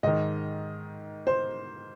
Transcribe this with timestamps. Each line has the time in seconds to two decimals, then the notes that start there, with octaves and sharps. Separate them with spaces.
0.03 G#2 D#3 D#5
1.27 C5